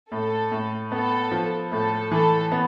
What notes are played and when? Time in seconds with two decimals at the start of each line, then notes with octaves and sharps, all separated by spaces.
0.11 A2 A4
0.52 A2
0.92 B3 A4
1.31 F3
1.72 A2 A4
2.11 E3 A4
2.52 B3